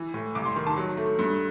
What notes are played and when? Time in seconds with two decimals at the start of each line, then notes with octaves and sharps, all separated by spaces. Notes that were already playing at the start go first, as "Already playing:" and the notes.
Already playing: E3
0.14 A2
0.35 C2 D6
0.46 C6
0.56 D#3
0.67 A5
0.77 F#3
0.97 A3
1.19 G2